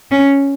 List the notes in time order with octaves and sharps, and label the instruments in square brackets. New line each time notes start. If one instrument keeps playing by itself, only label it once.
[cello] C#4